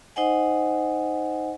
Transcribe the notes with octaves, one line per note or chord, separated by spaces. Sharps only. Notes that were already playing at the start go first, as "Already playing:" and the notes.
D#4 C5 D#5 F#5 G#5